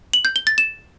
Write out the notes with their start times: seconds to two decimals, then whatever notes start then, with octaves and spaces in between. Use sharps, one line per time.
0.13 F#7
0.25 G6
0.36 G7
0.47 A6
0.58 E7